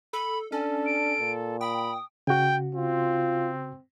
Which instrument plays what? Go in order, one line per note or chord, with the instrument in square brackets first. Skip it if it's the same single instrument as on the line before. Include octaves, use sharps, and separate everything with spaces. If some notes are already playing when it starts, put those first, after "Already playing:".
[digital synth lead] A4 [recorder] B5
[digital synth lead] C#4 [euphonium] D4 [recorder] A4
[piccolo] D7
[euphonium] A#2
[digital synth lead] G5 [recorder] B5 [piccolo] D#6
[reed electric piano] C#3 F#4 [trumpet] G5
[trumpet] C4 [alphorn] F4